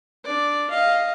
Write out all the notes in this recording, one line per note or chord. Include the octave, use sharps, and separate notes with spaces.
D4 D5
D#5 F5